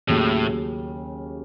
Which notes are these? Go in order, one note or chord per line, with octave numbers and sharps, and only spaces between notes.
D#2 A2 C#3 F#3